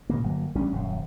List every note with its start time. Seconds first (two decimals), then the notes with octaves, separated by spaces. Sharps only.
0.09 A#2 C#3 A#3
0.24 G1 F#3 A#3
0.55 A1 G3 C#4 D4
0.73 D#1 F#2